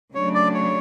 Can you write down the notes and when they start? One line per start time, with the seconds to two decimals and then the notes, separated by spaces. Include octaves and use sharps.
0.14 C#3 F#3 A3 D4 C#5
0.35 D5
0.54 C#5